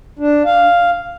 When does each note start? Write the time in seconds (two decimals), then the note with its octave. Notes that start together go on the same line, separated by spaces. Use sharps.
0.19 D4
0.45 F5